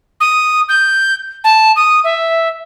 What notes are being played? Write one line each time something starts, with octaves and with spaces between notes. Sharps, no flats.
D#6
G6
A5
D#6
E5